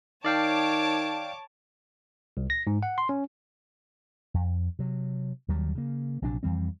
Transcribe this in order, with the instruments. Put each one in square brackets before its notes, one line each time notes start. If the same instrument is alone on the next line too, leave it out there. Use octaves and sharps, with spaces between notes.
[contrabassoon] D#3 [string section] C#5 A5 D6 [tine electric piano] D5 F5 G5
[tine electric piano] C2
A#6
G#2
F#5
C6
C#4
[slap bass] F2
C3 F#3
D#2 D#3 F#3 G3
C#3 A#3
A#1 C3 F#3 D4
F2 E3 G3 C4